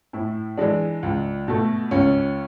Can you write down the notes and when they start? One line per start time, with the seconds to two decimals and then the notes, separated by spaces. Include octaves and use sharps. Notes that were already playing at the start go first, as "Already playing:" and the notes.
0.13 A2 E4
0.57 E3 G#3 D4
1.03 C#2
1.48 B2 A3
1.91 C#2 C#4